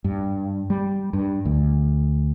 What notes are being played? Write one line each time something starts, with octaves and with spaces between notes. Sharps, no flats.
G2
G3
G2
D2